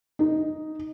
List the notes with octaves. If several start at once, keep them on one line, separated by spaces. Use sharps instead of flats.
D#4